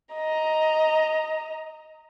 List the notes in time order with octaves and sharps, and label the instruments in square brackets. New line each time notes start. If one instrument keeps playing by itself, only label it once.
[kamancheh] D#5 A#5